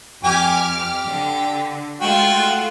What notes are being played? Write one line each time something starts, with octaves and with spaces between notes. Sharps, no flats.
F2 G4 G#5 D6 F6
G4
D3
G#3 A3 F4 F#4 G5